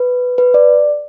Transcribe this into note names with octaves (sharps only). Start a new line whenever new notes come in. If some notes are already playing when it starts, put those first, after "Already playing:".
Already playing: B4
B4
D5